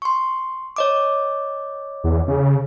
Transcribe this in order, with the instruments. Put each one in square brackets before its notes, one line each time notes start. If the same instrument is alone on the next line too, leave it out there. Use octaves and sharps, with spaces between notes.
[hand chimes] C6 C#6
C#5 D#5 D6
[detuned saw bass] E2
C#3